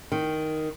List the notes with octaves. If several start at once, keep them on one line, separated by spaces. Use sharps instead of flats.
D#3